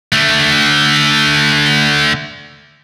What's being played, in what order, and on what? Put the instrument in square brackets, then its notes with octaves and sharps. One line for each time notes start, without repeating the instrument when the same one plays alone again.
[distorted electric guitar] D3 A3